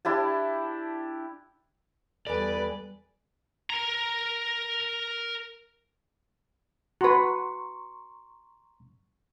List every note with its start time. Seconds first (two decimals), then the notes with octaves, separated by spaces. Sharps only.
0.05 D4 E4 G4 A5
2.27 E2 G3 A4 B4 D5 G#5
3.70 A#4 A#5
7.01 F#4 B4 A#5 C6 C#6